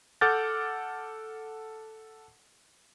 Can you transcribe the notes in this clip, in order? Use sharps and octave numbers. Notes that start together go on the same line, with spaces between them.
A4 F#5 D6 F6 G6 A6